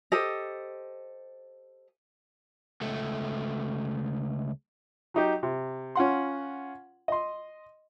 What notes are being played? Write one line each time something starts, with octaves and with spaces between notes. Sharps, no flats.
G4 A4 C5 D#5
C#2 A3
F#3 D#4 G4
C3
C#4 F4 F#5 C6
D#5 C6